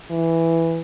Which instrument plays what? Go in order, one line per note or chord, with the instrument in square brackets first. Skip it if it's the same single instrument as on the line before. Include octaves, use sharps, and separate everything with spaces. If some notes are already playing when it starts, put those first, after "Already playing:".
[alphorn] E3